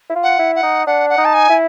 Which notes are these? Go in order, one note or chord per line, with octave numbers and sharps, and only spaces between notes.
E4
F4
F#5
E4
F#5
D#4
D4 F#5
F#5
D#4
A5
G#5
E4